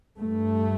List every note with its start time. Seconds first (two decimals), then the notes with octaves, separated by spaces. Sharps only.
0.19 G2 A3